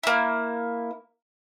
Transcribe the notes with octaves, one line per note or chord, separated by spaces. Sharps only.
A#3 E4